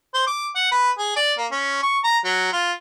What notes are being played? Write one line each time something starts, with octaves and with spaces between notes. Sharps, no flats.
C5
D6
F#5
B4
G#4
D5
A#3
C#4
C#6
A#5
F#3
F4